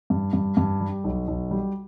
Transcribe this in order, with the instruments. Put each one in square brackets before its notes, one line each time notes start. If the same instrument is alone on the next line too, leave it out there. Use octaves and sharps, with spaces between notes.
[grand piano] G2
G2
G2
G3
B1
B1
G3